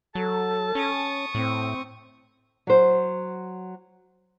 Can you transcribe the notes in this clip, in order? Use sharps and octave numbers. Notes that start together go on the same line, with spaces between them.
F#3 A4 A5
C#4 C#6 D#6
A2 C4
F#3 C5